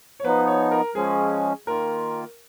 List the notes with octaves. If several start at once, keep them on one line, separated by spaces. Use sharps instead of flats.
C#5
F3 B3 D#4 B4
C#5
A#4
F3 G#3 C#4 G#4
D#3 A#3 F4 A#4